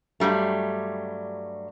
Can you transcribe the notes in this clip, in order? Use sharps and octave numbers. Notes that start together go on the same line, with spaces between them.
G2 F#3 G3 A3